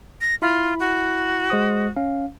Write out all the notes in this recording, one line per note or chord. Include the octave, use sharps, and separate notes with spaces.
A#6
E4 F4 B5
F#4
G#3 C5 D#6
C#4 F5